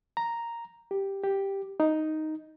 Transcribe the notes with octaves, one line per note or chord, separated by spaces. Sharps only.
A#5
G4
G4
D#4